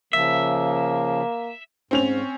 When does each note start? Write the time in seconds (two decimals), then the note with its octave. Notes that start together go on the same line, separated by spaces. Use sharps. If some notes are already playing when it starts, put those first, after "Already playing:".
0.13 C#3 F3 A#3 E5
1.91 G#2 C4 C#4 F7